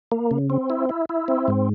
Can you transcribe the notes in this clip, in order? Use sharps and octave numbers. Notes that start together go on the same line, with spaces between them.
A#3
C#3
C4
E4
E4
E4
C4
G#2